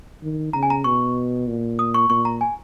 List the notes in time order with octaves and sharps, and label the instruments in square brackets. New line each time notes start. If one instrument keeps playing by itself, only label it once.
[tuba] D#3
[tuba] C#3 [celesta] A#5
[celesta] G#5
A#5
[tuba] B2 [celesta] C#6
[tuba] A#2
[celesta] D#6
C#6
[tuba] A#2 [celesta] C#6
[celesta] A#5
G#5